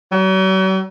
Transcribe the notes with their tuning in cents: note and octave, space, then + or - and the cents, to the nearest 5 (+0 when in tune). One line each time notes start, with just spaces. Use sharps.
F#3 +45